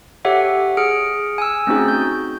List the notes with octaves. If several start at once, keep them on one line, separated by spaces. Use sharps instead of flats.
G4 A4 C#5 E5 F#5
G#4 F6 C#7 D7
G#5 E6
A3 C4 C#4 D#4 F#4 G#4
G6